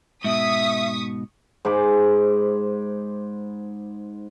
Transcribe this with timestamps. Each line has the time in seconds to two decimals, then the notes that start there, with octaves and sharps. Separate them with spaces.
0.24 G#2 B2 E5 C#6 D#6 B6
1.65 G#2 C5 B5 D6